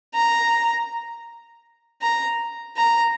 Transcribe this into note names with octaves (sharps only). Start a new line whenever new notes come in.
A#5
A#5
A#5